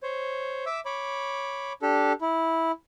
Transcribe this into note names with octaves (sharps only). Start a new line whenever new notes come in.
C5 C#5
E5 D6 E6
C#5 B5 D6
D4 G4 A4
E4